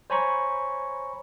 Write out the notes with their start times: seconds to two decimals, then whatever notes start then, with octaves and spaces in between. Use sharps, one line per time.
0.10 C5 C#5 G#5 A#5 B5 C#6